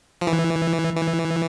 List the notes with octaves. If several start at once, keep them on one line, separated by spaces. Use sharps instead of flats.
F3
E3
E3